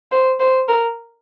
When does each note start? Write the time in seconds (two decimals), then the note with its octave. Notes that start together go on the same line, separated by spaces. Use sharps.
0.12 C5
0.40 C5
0.68 A#4